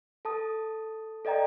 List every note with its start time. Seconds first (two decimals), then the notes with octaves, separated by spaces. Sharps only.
0.25 A4 A5 D#6
1.25 A4 D5 D#5 G5 A#5